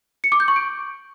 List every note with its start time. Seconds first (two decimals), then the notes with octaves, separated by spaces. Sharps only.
0.24 C#7
0.32 D6
0.40 G6
0.48 C#6
0.56 D7